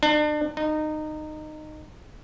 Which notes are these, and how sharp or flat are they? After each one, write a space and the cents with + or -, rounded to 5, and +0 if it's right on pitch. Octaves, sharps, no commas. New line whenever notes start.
D4 +35
D#4 -20